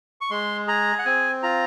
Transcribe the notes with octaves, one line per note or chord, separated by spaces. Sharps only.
C#6
G#3 C6
G#4 A#5
F#5
C4 G#5
F4 A#5